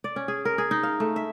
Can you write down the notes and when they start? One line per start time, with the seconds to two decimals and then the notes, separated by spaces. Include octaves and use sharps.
0.04 D5
0.16 C#4
0.28 G#4
0.45 A#4
0.58 G#4
0.71 D#4
0.83 F5
1.00 A3
1.16 E5